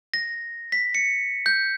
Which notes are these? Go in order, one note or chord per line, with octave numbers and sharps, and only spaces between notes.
A#6
B6
C#7
G6